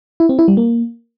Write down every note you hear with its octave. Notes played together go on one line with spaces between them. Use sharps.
E4
C4
E4
G3
A#3